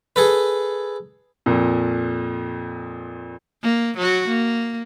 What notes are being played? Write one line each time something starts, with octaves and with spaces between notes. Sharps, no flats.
G#4 A4 B4
F2 A#2
A#3
F#3 F#4
A#3